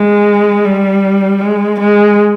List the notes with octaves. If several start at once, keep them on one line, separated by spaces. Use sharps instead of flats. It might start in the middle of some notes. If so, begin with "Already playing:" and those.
Already playing: G#3
G3
G#3
G#3